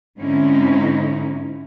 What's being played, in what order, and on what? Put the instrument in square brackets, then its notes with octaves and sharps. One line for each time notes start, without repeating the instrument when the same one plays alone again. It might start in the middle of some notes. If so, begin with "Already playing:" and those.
[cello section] G#2 D3 C4 C#4 D#4 E4